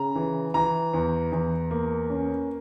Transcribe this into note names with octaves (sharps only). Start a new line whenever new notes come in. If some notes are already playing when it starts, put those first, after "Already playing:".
Already playing: C#3 A#5
E3
E3 A#5
E2
E2
A#3
C#4